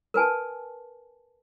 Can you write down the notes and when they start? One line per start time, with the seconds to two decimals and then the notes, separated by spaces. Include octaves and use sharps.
0.14 A#4 B4 G#5 A5